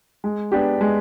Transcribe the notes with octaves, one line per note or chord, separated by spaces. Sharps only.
G#3
B3 D4 G4
G#3